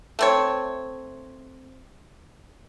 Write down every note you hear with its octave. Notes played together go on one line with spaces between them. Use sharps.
A3 C4 C#5